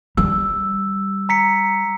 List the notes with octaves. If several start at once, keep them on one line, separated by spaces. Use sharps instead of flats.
G3 E6
A#5 B6 C#7